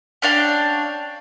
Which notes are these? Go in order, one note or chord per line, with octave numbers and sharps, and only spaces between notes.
C#4 D4 F5 G5